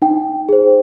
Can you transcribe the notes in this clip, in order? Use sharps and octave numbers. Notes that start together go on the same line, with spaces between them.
D#4 G5
G#4 C5